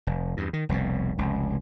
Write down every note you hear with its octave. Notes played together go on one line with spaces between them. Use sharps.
F1
E2 G2
D#3
F1 C2 G#2 B2
F1 C#2